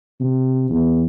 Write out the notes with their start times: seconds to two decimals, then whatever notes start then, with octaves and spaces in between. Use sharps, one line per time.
0.20 C3
0.70 E2